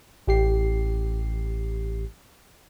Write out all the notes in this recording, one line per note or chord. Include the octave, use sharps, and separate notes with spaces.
A1 G4 C7